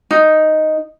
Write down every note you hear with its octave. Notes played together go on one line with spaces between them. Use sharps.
D#4